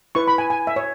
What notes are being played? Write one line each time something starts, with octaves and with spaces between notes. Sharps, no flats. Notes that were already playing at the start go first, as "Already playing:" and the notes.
E4 B4 C#6
B5
G#5
G#5
E5
C#5